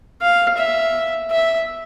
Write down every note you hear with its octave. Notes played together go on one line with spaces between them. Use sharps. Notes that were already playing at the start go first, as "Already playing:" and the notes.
F5
E5
E5